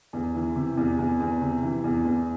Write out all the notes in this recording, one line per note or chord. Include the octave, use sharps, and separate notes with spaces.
E2
E3
C3
E2
E2
E2
C3
E3
E2
E2